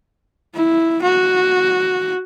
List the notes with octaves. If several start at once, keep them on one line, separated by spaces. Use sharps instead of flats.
E4
F#4